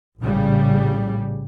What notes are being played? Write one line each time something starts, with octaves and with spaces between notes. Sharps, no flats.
A#1 A2 C#3 G3